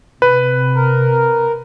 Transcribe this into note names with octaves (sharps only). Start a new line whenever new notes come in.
C3 B4
A#4